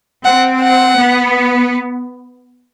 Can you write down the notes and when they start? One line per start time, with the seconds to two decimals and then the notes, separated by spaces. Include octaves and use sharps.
0.25 C4 F#5
0.61 F#5
0.97 B3